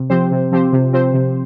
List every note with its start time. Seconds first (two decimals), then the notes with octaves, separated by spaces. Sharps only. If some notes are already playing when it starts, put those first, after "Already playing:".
Already playing: C3
0.10 F3 C4 G4 C5
0.32 C3
0.52 F3 C4 G4 C5
0.73 C3
0.93 F3 C4 G4 C5
1.13 C3